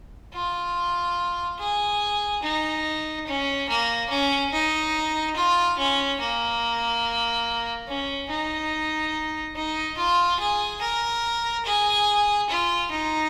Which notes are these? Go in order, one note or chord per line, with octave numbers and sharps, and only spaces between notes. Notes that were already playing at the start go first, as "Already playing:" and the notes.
F4
G#4
D#4
C#4
A#3
C#4
D#4
F4
C#4
A#3
C#4
D#4
D#4
F4
G#4
A#4
G#4
F4
D#4